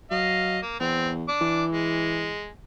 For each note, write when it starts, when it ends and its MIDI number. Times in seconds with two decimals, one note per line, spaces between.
0.11 0.59 54
0.11 0.59 75
0.11 0.59 77
0.62 0.75 58
0.80 1.26 40
0.80 1.10 60
1.28 1.64 62
1.28 1.64 86
1.41 2.36 52
1.73 2.49 56